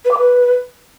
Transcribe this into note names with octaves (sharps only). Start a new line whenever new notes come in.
B4
D6
B4